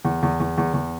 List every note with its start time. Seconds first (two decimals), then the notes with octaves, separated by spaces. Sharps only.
0.05 E2
0.23 E2
0.40 E2
0.58 E2
0.74 E2